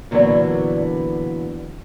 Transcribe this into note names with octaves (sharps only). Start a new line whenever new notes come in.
A#2 D3 E3 F#3 B3